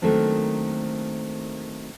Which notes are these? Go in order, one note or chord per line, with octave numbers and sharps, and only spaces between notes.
D#3 F#3 A3 A#3 C4 D4